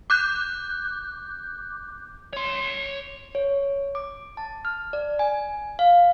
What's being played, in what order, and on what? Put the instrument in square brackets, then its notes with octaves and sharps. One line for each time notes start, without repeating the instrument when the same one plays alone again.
[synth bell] D6 F#6 G6
[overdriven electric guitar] C#5 C6
[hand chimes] C#5
D6
A5
F6
D5
G#5
F5